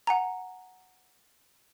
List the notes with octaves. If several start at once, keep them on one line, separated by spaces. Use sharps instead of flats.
F#5 G#5 A#5